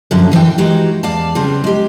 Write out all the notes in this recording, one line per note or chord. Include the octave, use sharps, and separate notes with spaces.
F#2 A#2 D3 F3 F#3
D#2 E3 D5 G5
E3 G#3 D#4 F#4 G4
E2 D5 F5 A5
C#3 G3 B3 C4
G#3 G4